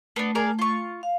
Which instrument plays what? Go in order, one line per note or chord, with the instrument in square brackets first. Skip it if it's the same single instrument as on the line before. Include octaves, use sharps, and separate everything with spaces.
[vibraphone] A3 [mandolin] B3 D4
[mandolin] G#4 A#4 D5
F4 C#6
[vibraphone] F5